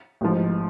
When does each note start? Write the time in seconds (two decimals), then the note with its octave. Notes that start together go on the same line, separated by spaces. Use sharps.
0.21 A1 G#2 F3